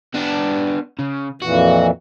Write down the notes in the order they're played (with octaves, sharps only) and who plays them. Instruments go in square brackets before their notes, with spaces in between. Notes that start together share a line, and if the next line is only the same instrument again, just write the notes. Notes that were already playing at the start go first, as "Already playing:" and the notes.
[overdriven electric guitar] B3 D4
C#3
[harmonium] F2 A#2 E3 [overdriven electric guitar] F#4